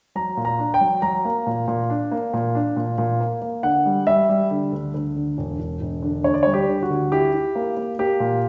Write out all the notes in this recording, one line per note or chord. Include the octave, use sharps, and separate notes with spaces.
F#3 A#5
A#2
A#5
D4
G5
F#3
F#3 A#5
A#3
A#2
A#2
D4
A#3
A#2
D4
A#2
A#2
A#3
A#3
D3 F#5
G3
G3 E5
G3
D3
D2
D2
D3
E1
E1
E1
D3
D2 C#5
D5
G3 C#5
G4
D3
F#4
D2
E4 G4
E4
A#3
A#3
A#3 G4
A#2